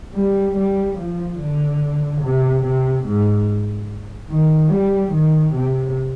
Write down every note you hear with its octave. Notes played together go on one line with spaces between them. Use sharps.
G3
G3
F3
D3
C3
C3
G#2
D#3
G3
D#3
C3